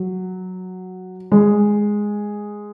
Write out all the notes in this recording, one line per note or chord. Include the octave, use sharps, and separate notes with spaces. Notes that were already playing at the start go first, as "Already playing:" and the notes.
Already playing: F#3
G#3